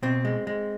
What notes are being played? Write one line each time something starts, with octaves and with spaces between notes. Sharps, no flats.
B2 C4
G#3
G#3